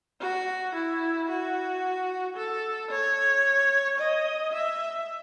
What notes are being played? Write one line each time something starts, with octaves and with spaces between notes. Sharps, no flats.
F#4
E4
F#4
A4
C#5
D#5
E5